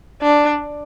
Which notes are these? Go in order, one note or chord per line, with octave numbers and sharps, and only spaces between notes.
D4